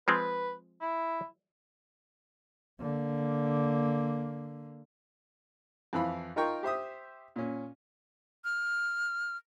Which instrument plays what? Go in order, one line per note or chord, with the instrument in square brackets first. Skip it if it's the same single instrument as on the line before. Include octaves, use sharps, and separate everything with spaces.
[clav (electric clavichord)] F3 G#3 C4 [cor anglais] B4
[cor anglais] E4
[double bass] D3 A#3
[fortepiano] F2 E3 F5 B5
D#4 F4 A#4 G5 C#6
G4 C5 E5 D#6
A#2 C#4
[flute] F6